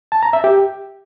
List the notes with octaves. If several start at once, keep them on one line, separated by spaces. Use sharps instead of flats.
A5
A#5
E5
G4